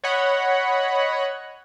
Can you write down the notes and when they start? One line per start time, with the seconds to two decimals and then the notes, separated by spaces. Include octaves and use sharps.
0.04 C#5 D#5 F#5 B5